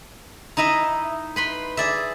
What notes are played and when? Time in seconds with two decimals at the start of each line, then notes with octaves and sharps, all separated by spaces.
0.57 D#4 E4 D#5 E5
1.36 B4 B5 C6
1.77 G#4 D5 E5